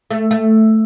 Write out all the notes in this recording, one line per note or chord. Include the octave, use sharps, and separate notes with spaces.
A3
A3